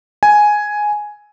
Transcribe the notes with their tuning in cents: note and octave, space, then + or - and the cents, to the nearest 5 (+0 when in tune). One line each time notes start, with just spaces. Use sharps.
G#5 +5